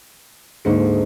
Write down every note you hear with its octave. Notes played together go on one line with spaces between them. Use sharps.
D2 G#2 G#3 A#3 D#4 C#7